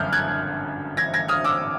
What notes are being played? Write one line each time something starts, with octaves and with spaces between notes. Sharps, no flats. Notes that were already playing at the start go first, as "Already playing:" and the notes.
Already playing: G1 F#2 D3 F6 G6
F#6 G#6
G#6 A#6
G#6 A#6
D#6 F6
D6 E6